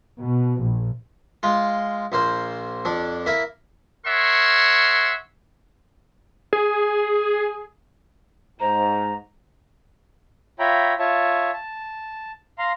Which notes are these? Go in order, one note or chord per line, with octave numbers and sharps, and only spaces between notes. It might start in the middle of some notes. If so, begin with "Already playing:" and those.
B2
A#1
G#3 F4
A#1 A#3 C5
F2 D4
A#3 E4 B5
A#4 C#5 E5 F#5 C6
G#4
G#2 C5 A#5
F4 C#5 E5 G5 A#5 B5
F4 C#5 E5 A5
A5
F5 A#5 C6